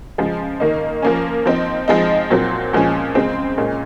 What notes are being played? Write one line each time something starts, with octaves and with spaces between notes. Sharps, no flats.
C#3 F3 G#3
D#3 A#3 D#4
F3 A#3 C#4
F3 C4 D#4
F3 G#3 C4 D#4
A#2 F#3 C4
A#2 F3 G#3 C#4
C#3 G#3 C4
A#2 G#3 C#4